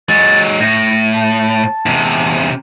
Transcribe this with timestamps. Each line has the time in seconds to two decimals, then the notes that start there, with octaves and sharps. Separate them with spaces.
0.09 F#3 G#3 A6
0.60 A2 A#6
1.14 A5
1.86 E2 C3